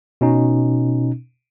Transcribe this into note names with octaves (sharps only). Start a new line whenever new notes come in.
B2 C#4 D#4